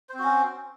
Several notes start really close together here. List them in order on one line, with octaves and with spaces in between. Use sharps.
C5 C4 F#4 C#4